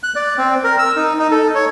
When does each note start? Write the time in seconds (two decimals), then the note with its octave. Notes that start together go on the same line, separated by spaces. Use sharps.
0.03 F#6
0.16 D5
0.38 C4
0.64 A#4
0.79 E6
0.96 D#4
1.19 D#4
1.31 A4
1.55 C#5